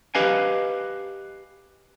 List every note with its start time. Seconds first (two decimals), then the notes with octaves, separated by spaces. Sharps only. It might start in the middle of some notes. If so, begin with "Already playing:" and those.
0.15 G4 B4 D#5 F5 G#5